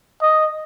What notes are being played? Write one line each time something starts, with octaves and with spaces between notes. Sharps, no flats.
D#5